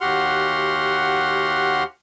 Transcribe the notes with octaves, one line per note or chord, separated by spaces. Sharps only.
D#2 F#4 G4 F#5 C6 F6